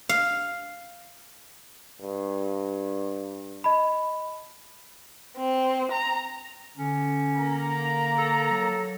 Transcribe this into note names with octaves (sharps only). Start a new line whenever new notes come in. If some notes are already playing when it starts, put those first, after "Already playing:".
F5
G2
D#5 A5 B5
C4
A#5
D3 C#4
A#3 A#5
A4
F#3